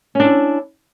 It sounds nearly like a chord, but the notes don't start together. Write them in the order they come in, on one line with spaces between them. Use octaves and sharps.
C#4 D4 E4